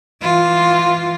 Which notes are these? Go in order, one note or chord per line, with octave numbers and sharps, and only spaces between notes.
E3 F4